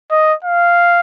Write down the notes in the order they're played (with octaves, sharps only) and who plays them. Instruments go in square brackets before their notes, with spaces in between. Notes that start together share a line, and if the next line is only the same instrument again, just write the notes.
[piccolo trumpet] D#5
F5